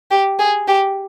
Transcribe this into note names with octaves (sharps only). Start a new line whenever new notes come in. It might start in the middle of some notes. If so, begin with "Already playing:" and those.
G4
G#4
G4